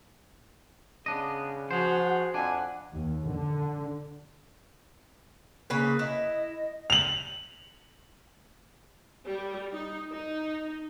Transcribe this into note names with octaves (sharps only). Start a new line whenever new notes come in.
C#3 B3 D4 D#5
F3 F#4 G#4 C5 F#5
F2 D4 F#5 G#5
D#2
D3
C#3 A#3 B4
E4 D#5
F7 F#7
G3
D#4
D#4